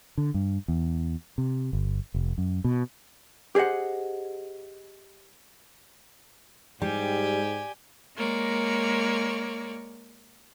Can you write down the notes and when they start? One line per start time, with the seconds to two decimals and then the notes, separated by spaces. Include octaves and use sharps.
0.18 D3
0.34 G2
0.68 E2
1.38 C3
1.73 G1
2.14 F1
2.38 F#2
2.64 B2
3.55 G4 G#4 C5 D#5 F#5
6.82 G#2 G3 G4 G#5
8.16 G#3 A#3 C#5 D5